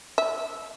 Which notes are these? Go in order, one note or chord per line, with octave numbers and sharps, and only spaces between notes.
E5